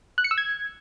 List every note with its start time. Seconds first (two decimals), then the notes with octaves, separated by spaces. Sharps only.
0.18 F#6
0.24 C#7
0.31 E6
0.38 G#6